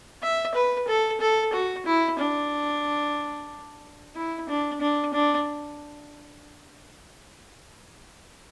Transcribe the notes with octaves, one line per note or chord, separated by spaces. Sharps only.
E5
B4
A4
A4
F#4
E4
D4
E4
D4
D4
D4